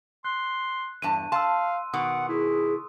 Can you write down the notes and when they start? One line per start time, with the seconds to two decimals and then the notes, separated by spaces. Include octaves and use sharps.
0.25 C6 F#6
1.02 E2 G2 A5 D#7
1.32 F5 A5 C6 E6
1.94 B2 D#3 F#5 D#6
2.29 E4 G#4